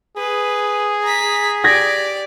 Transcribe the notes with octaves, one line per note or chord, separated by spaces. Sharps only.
G#4 B4
A#5 B6
G4 D5 G#6 A#6 B6